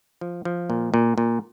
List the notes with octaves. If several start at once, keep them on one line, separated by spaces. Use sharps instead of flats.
F3
F3
A#2
A#2
A#2